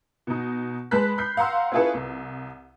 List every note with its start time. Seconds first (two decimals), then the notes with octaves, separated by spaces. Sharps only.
0.27 B2 D#4
0.91 G#3 B4 A5 B5 F#6 B6
1.18 B5 F6 G6 C7
1.37 F5 F#5 A#5 C6 E6
1.72 C#4 E4 F4 G#4 A4 B4
1.94 C2